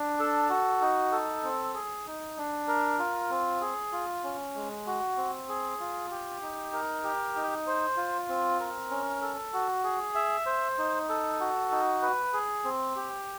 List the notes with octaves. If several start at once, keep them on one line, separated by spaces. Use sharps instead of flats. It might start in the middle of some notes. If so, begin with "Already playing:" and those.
Already playing: D4
A4
F#4
D#4
A4
C4
G#4
D#4
D4
A#4
F4
C4
G#4
F4
C#4
G#3
F#4
C4
G#4
F4
G4
D#4
A#4
G4
D#4
C5
F4
C4
A#4
C#4
A4
F#4
G#4
E5
C5
D#4
A4
F#4
D#4
B4
G#4
C4
G4